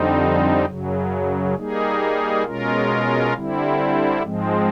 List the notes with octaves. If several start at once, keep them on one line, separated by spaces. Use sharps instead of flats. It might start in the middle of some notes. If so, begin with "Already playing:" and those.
Already playing: F2 D3 G3 C4 D#4
F#2 C#3 F#3
G3 A#3 D#4 G#4
B2 G#3 C#4 F4 A#4
D3 G3 C4 E4
G#2 F3 G#3 C4